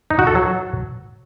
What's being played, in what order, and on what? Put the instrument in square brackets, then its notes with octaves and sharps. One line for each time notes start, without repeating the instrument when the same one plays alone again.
[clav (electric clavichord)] D#4
F#4
A4
F#3